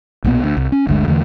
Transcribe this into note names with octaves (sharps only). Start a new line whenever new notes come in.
B1 A#2 E3 B3
D2
C2
C#4
G1 D2 D3 G#3
E2 D3 E3 A3